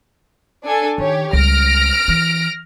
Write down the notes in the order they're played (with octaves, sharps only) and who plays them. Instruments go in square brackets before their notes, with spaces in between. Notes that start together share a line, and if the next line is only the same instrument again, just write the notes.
[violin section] D4 A4 G#5
[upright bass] D#3 [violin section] G4 C#5
[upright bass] C#2 G3 [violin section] F6 A#6 D7
[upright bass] E3